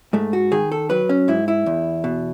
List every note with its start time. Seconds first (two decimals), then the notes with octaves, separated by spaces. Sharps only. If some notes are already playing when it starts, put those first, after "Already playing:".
0.13 G#2 A3
0.33 F#4
0.52 D#3 G#4
0.72 A4
0.90 F#3 B4
1.09 C#4
1.28 G#2 E4
1.48 E4
1.66 E2
2.04 B2